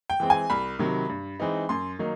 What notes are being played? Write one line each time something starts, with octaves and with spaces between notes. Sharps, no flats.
G5
E3 G#3 C4
G#5
C2 B5
C3 D#3 F#3
G2
E3 G#3 C4 D#4
F#2 C6
D#3 F#3 A#3 D#4